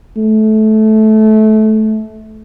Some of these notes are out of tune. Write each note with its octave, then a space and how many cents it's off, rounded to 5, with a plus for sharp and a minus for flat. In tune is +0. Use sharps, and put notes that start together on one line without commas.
A3 -20